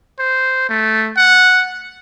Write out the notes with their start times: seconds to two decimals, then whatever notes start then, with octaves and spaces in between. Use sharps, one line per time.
0.19 C5
0.69 A3
1.17 F#5